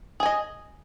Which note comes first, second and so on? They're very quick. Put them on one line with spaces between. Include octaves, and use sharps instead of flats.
G#4 G#5 D#5